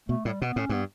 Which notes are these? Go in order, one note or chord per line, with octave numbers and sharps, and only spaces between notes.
B2 A3
A2 G3
B2 B3
A2 C#4
G2 B3